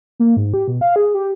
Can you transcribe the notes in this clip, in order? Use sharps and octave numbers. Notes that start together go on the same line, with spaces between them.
A#3
G#2
G4
B2
F5
G#4
G4